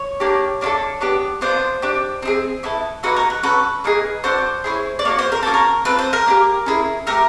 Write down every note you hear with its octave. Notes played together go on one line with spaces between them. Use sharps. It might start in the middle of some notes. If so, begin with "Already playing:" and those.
Already playing: C#5
A#3 D4 G4
A#3 D4 F4 A4
B3 D4 G4
B3 D4 F4 C5
D4 G4
C4 D#4 G#4
B3 E4 A4
A#3 D#4 F#4 A4 B4
A#4
B4
C#4 F#4 A4 B4
A#3 D#4 G#4
D4 F#4 A4 C5
C#4 E4 G#4
D5
A#3 D4 F#4 C#5
C5
A#4
A#3 C#4 F#4 A4
A#4
C4 F4 A4 B4
C5
A#4
A#3 D4 G4
C#4 E4 G#4
A3 D4 G4 A#4